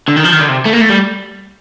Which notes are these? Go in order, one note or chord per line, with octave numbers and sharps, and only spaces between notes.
D3
D#3
F3
D#3
D3
C3
A3
A#3
A3
G3